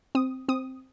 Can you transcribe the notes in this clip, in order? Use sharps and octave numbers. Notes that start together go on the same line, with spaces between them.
C4 D#6
C4 D#6